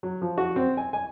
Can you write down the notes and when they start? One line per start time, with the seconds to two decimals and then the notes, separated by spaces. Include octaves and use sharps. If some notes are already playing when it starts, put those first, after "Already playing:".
0.03 F#3
0.22 F3
0.38 F#4
0.56 C4
0.77 G#5
0.93 G#5